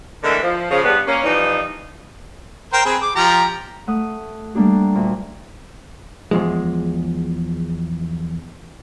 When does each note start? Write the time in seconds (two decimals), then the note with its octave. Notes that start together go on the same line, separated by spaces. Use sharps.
0.24 D3 E3 G#3 A3 B3 A#4
0.42 F3
0.70 C#3 F3
0.84 G2 G3 B3
1.07 A#3 C#4
1.24 E3 F3 G3 D#4
2.73 A#4 C5 G5
2.85 C4 G#4 B4
3.02 D6
3.15 F3 G4 A#5
3.87 A3 F#5 D#6
4.55 G3 A3 A#3 D4 G4
4.95 D2 A#2
6.31 E2 F3 G#3